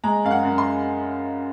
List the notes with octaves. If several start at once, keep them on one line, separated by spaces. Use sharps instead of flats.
G#3 A#5
F#2 F5
F#5
F#2
C6